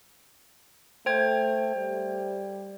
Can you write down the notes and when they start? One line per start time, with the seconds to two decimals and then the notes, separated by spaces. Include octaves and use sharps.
1.06 A3 C5 G5 G#6
1.76 G3